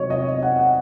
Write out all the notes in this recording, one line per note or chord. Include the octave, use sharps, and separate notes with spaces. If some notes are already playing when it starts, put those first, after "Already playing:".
Already playing: C3 F#3 C4 C#5 D#5
D#5
F#5
F#5